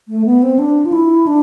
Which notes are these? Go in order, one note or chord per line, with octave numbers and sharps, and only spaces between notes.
A3
B3
C4
D4
F4
E4
D4